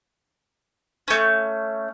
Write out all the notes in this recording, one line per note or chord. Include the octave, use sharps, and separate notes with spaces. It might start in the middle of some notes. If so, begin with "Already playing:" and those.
A3 C#4